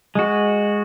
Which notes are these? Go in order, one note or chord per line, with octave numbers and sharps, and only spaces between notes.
G#3 F#4